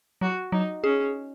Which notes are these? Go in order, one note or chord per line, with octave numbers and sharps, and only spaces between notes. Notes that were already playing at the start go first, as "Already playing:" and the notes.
F#3 F#4
F#3 D#4
C#4 G#4